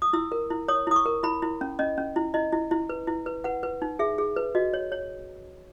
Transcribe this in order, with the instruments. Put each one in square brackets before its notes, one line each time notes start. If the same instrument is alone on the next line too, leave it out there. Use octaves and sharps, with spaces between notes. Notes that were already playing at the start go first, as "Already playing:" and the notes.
[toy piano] D#6
E4 E6
A#4
E4
C#5 D#6
E4 D#6
C#6
A#4
E4 B5
E4
C#4
C#4 D#5
C#4
E4
E4 D#5
E4
E4
B4
E4
B4
B4 F#5
B4
D#4
G#4 E5
G#4
B4
F#4 D#5
C#5
C#5